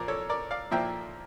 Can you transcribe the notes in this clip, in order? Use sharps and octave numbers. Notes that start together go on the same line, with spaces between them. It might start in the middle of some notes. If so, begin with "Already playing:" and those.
Already playing: A#2 F3 A#3 A#4 D5
A4 C#5
A#4 D5
D5 F5
A#2 F3 A#3 E5 G5